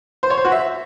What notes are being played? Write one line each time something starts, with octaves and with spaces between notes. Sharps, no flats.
C5
C#5
C5
F#4
E5